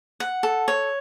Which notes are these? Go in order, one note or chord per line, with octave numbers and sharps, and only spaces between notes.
F#5
A4
C#5